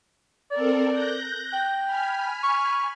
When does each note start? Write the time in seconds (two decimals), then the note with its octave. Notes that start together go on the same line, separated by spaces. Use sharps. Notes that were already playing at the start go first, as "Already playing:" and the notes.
0.51 C4 A4 A#4 D5
0.90 F#6 G6 A#6
1.53 G5
1.85 G#5 B5 F6
2.43 C#6